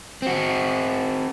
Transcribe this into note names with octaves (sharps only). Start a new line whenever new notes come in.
C4 F#4